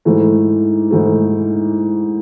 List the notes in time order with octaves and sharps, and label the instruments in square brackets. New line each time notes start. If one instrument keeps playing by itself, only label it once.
[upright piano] G#2 E3 A3
G#2 E3 A3